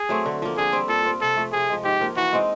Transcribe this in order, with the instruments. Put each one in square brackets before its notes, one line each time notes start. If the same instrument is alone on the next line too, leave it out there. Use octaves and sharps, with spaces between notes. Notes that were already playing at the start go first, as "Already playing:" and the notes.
Already playing: [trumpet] G#4
[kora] F#3 A3 C4
D3
F3 A#3
[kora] D3 [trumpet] G#4
[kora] G3 C4
[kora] A#2 [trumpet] A4
[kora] G3 C4 F4
[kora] C3 [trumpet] A4
[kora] F3 A3
[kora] C3 [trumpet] G#4
[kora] F3 G#3
[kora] G#2 [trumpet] G4
[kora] F3 A#3
[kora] E3 [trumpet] F#4
[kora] G#3 C4 D#4